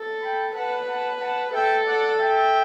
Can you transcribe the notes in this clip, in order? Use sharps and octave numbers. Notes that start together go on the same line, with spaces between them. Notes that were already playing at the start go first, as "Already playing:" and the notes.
Already playing: A4
G5 B5
B4 F#5 A5
F#5 A5
F#5 A5
A4 E5 G5
D5 F#5
E5 G5